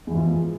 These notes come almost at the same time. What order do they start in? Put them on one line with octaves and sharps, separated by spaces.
E2 E3 G#2 F3